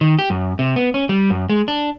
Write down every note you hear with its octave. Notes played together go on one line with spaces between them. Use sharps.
D#3
G4
F#2
C3
B3
C#4
G3
F#2
G#3
D4